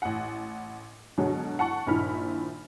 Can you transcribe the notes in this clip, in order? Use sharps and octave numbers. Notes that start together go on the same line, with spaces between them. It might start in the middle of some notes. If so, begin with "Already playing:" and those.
A1 F#5
B2 D3 F#3 G#3 F#4 C#5
F#5 A5 C#6
A#1 G2 D#3 E4 B5 F6